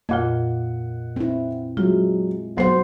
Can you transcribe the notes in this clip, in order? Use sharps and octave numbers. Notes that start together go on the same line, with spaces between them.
F2 A#2 A#3 F4 D#5 F#5
C4 E4
F#3 G#3 F4
B1 B3 C5 F#5 C7